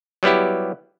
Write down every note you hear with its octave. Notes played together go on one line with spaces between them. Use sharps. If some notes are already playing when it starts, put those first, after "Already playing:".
F#3 G3 B3 E4 G4